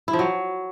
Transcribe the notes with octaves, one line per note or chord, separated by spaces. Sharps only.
E4
F3
F#3